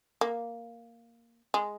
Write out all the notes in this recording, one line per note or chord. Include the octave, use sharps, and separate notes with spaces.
A#3
G#3